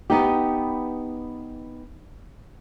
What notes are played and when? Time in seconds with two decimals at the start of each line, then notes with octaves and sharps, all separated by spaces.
0.10 B3 D#4 G4